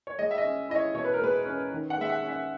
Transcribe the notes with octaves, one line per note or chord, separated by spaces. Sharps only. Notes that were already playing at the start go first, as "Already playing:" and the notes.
C#5
G#3 D#5
E5
D#5
C#4
E4 D#5
C#5
B2 C#5
B4
A#4
G#3 B4
C#4
D#3
F#5
G#3 E5
F#5
C#4
E5